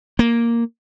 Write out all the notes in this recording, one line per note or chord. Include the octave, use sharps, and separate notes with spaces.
A#3